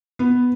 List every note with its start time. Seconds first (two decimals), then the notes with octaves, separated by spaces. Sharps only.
0.19 B3